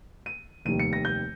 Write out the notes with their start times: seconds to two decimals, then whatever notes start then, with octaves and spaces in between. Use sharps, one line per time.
0.26 D#7
0.65 F1 D#2 D#3 G3 D#7
0.79 C#7
0.93 A#6
1.05 G6